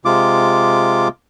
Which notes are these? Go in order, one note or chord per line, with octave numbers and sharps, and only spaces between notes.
C3 G#3 F4 D6